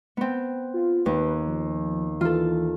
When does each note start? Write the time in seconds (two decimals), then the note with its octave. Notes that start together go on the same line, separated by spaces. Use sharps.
0.17 B3 C4
0.74 F4
1.06 D#2 B4
1.48 F3
2.21 E3 F4 A4